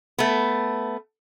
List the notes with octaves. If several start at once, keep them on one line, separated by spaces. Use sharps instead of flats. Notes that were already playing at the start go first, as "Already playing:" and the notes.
A3 B3